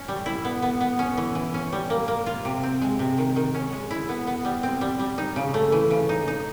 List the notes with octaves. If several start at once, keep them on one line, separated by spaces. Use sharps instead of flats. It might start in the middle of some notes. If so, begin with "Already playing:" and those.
Already playing: C#4
G3
E4
B3
B3
B3
C#4
E3
E3
C#4
G3
A#3
A#3
F4
C3
C4
G#3
C3
D#3
D#3
C#4
G#3
E4
B3
B3
G3
C4
G3
G3
D#4
C#3
A3
E3
C#3
D#4
D#4